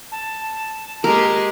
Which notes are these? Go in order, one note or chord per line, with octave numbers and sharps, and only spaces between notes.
A5
G#3 A#3 G4 A#4